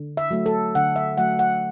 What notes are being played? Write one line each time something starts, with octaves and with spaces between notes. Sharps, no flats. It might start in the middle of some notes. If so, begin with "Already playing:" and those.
Already playing: D3
E5
F#3 A3
A4
D3 F#5
E5
F#3 A3 F#5
F#5